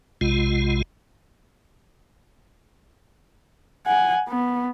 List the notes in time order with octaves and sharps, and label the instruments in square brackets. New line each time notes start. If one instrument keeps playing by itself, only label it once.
[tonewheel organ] B1 C3 G#3 F4
[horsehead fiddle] F#5 G#5
B3